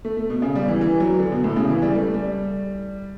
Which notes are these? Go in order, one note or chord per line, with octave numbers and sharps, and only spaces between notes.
A3
A3
B2
C#3
G3
E3
E3
F#3
D3
B2
A2
C#3
E3
G3
A3
G3